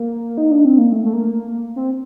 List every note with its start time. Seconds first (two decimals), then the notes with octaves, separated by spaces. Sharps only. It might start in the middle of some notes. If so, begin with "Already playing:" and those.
Already playing: A#3
0.38 D#4
0.51 D4
0.65 C4
0.78 A#3
0.92 A3
1.05 A3
1.13 A#3
1.76 C4